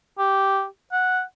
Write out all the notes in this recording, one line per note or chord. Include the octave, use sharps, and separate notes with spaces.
G4
F#5